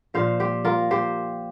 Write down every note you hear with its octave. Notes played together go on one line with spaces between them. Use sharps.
A#2 F3 C5 F5
G4 C5
F4 A#4
G4 C5